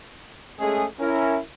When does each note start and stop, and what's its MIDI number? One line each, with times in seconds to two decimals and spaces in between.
0.59 0.85 56
0.59 0.85 57
0.59 0.85 61
0.59 0.85 68
1.00 1.39 61
1.00 1.39 64
1.00 1.39 70